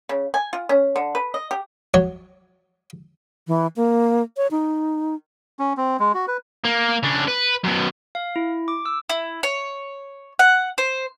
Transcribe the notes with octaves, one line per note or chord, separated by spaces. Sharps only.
C#3
G#5
F4
C#4
D3
B4
D#5
G4
F#3 C#5
E3
A#3
C#5
D#4
C#4
C4
G#3
F#4
B4
A#3
C#3 D4
B4
F#2 B2
F5
E4
D6
E6
E4
C#5
F#5
C5